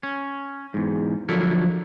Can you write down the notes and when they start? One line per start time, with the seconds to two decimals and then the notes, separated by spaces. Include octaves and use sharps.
0.03 C#4
0.74 E2 G#2
1.29 D3 F3 F#3 E4 A4 A#4